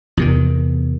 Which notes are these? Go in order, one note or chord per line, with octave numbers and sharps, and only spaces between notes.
E2 C3 D#3